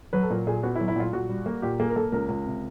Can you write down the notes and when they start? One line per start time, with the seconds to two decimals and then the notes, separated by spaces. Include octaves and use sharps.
0.13 F#3 B4
0.23 A4
0.30 A#2 A#4
0.47 A#2 G#4
0.63 B3 F#4
0.76 E4
0.80 F#3
0.88 E4
0.96 A#2 F4
1.13 A#2 F#4
1.29 G3
1.46 A#3
1.62 A#2 G4
1.79 A#3 G#4
1.90 A#4
1.96 A#3 A4
2.12 C#2 A#4
2.29 C#2
2.46 C3